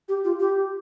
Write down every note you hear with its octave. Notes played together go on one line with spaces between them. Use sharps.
G4
F4
G4